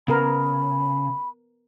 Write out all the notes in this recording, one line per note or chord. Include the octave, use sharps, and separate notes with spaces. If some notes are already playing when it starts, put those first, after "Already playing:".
C#3 B3 A#4 B5